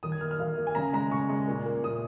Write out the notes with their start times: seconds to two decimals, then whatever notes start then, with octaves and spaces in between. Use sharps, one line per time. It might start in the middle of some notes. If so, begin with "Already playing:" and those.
0.03 D#3 D#6
0.12 G#6
0.21 A#3 F6
0.31 F6
0.39 D#3 F5
0.57 A#3
0.67 G#5
0.75 C#3 A#5
0.93 G#3 A#5
1.11 C#3 C#6
1.29 G#3
1.48 A#2
1.65 A#3
1.83 A#2 D#6